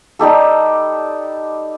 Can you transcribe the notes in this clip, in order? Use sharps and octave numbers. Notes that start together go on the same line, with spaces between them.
G3 D#4 G4 A4